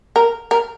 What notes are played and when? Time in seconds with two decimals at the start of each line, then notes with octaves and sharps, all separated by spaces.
0.16 A#4
0.51 A#4